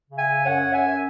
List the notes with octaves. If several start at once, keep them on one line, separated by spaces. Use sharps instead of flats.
C#3
E5 G#5
C#3
F#2 C#5 F#5
F#2
E5 G#5
F#2